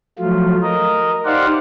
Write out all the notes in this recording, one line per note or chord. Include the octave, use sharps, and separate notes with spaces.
F3 F#3 A3 F4
A#4 D#5
D#4 G4 C5 D5 F5 F#5